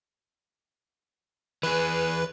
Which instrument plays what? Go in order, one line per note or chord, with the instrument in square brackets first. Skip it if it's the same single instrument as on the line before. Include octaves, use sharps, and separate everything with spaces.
[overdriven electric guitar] E3 G#4 [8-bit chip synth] B4